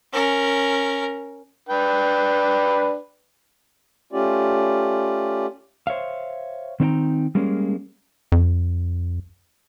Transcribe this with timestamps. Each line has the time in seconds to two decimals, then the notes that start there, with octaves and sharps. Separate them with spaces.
0.13 C#4 A#4
1.69 D4 B4 G5
4.13 A3 C#4 F4 G4 D5
5.87 C5 C#5 E5 F5
6.80 D#3 C4 D#4 C5 G5 A#5
7.35 G3 G#3 A#3 C#4
8.32 F2